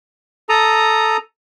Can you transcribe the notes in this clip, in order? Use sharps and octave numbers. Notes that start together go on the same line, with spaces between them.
A4 A#5 D#6